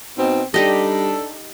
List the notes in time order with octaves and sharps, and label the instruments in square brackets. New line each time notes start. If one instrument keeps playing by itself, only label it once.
[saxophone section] B2 C4 [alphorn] D#4
[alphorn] G3 [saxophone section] D4 A4 [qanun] D#4 G4 D#5